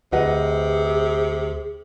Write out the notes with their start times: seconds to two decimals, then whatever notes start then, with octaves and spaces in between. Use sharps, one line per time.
0.13 D2 C3 G#4 B4 D#5 F#5